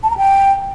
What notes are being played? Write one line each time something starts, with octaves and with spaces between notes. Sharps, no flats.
A5
A#5
G5